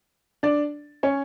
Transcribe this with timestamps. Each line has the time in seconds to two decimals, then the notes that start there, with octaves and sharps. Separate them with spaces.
0.43 D4 D5
1.03 C#4 C#5